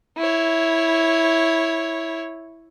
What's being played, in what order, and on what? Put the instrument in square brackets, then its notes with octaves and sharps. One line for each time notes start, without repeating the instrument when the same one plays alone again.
[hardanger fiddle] E4 C#5